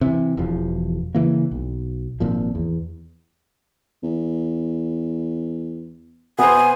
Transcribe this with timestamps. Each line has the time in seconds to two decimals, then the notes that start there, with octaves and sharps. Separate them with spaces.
0.01 C3 E3
0.37 E1 E2 F3
1.15 C#3 E3 A#3
1.51 B1
2.20 G#1 A#2 F3
2.55 E2
4.03 E2
6.39 B2 B3 C5 G#5